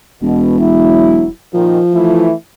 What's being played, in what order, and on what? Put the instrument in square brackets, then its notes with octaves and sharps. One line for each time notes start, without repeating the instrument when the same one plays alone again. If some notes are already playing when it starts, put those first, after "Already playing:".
[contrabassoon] E1 [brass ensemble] B2
[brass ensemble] F#3 E4
[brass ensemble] A#2 D#3 [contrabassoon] F3
[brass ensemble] E3 A3 E4